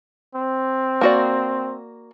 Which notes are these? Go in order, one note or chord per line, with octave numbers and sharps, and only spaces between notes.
C4
A#3 F#4 D5